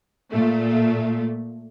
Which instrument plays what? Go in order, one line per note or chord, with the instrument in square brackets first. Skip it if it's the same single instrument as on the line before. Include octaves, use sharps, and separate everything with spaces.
[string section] A#2 A3